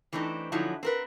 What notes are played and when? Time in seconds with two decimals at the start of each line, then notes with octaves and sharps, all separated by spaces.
0.13 E3 A3 C4 D4 D#4
0.52 D3 F3 F#3 C#4 D#4 E4
0.83 C4 A#4 B4